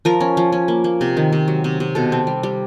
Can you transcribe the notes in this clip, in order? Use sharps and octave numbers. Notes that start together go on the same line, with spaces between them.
F3 A#4
C#4
F3
C#4
A#3
A#3
C3
D#3
C3
F#3
C3
C3
B2 A4
C4
G3
G3